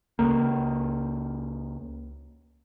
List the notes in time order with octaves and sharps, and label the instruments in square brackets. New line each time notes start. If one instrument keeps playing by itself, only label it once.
[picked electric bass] C#2 A#3